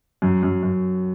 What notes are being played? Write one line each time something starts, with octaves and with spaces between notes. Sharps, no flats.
F#2
F#2
F#2